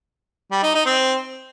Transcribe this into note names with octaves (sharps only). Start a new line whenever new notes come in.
G3
D#4
D#4
C4